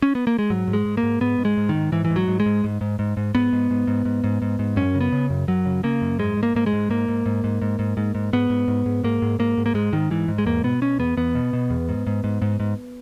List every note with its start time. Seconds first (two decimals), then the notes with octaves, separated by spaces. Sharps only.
0.02 C#4
0.15 B3
0.27 A#3
0.39 G#3
0.50 G#2 F#3
0.68 G#2
0.73 G#3
0.86 G#2
0.97 A#3
1.03 G#2
1.21 G#2 B3
1.39 G#2
1.45 G#3
1.57 G#2
1.69 D#3
1.74 G#2
1.92 G#2 E3
2.05 E3
2.10 G#2
2.16 F#3
2.28 G#2
2.40 G#3
2.46 G#2
2.64 G#2
2.81 G#2
2.99 G#2
3.17 G#2
3.35 G#2 B3
3.53 G#2
3.70 G#2
3.87 G#2
4.05 G#2
4.24 G#2
4.42 G#2
4.59 G#2
4.76 F#2 C#4
4.95 C#3
5.01 B3
5.12 C#3
5.30 F#2
5.48 F#2 F#3
5.66 C#3
5.83 C#3 A#3
6.02 F#2
6.19 G#2 G#3
6.37 G#2
6.43 A#3
6.55 G#2 A#3
6.66 G#3
6.73 G#2
6.90 G#2 A#3
7.08 G#2
7.26 G#2
7.44 G#2
7.62 G#2
7.79 G#2
7.97 G#2
8.15 G#2
8.33 G#2 B3
8.50 G#2
8.68 G#2
8.86 G#2
9.04 G#2 A#3
9.22 G#2
9.39 G#2 A#3
9.58 G#2
9.66 A#3
9.74 G#2 G#3
9.93 G#2 D#3
10.10 G#2 E3
10.28 G#2
10.38 G#3
10.46 E2 A#3
10.64 B2 B3
10.82 B2 C#4
10.99 E2 B3
11.17 E2 B3
11.35 B2
11.53 B2
11.70 E2
11.89 G#2
12.07 G#2
12.24 G#2
12.42 G#2
12.60 G#2